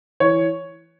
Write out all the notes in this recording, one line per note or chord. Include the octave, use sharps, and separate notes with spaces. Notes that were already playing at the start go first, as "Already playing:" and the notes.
E3 C#5